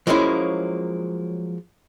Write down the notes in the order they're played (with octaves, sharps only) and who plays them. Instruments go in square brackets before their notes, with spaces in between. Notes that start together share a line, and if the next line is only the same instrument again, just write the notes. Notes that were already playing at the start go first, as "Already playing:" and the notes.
[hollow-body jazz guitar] F3 F#3 G#3 A#3 C#4 E4